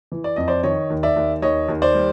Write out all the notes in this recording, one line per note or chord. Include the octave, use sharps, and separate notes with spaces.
E3
D5
F2 D#5
C5 D5
D#3 C#5 D#5
D#2
D5 E5
D#2
D#2 C#5 D#5
D#2
C5 D5
G3